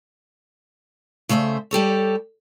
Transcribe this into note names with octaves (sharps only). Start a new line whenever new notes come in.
C#3 A3 C5 D#5 E5
G3 G4 A4 C#5